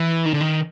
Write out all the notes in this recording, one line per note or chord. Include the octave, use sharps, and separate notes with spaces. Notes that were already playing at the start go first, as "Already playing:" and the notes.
Already playing: E3
D#3
D3
D#3